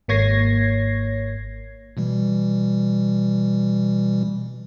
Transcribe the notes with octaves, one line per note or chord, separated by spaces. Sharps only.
G#1 A#3 C#5 G#6 A#6 C7
B2 E3 G3